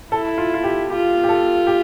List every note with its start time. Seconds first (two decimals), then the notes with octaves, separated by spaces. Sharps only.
0.12 E4 A4
0.38 F4
0.54 F4
0.64 G4
0.90 F4 G4
1.24 G4
1.29 A4
1.67 G4